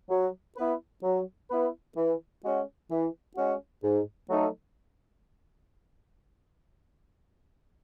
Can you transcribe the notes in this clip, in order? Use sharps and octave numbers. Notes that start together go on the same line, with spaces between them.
F#3
B3 E4 B4
F#3
B3 E4 B4
E3
G#3 C#4 F#4
E3
G#3 C#4 F#4
G#2
F#3 A3 D#4 A4